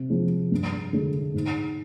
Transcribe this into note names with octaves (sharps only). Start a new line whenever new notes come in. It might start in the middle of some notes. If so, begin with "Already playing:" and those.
Already playing: C3
F3 G#3
G2
D3 G#3
G#2